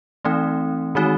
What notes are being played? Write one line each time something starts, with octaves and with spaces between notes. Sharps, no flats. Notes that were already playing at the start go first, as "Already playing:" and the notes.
E3 A3 C4 D#4
D#3 G#3 C4 D#4 F#4